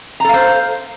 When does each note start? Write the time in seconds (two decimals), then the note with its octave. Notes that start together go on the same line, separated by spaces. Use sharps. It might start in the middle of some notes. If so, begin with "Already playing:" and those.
0.20 A#5
0.25 A4
0.29 F5
0.34 C5